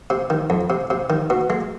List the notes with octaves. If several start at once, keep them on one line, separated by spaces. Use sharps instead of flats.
C3
D#3
F2
C3
C3
D#3
B2
G#3